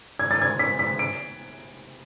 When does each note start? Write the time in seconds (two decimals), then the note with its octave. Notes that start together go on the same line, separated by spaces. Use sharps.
0.19 G#6
0.31 A6
0.42 G#6
0.59 B6
0.79 B6
0.99 D7